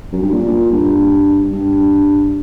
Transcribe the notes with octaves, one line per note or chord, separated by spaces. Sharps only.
F#2
G2
A#2
G2
G2